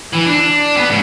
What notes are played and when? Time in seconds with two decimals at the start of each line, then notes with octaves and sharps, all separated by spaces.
0.13 E3
0.26 D4
0.77 B3
0.90 G#2 C#3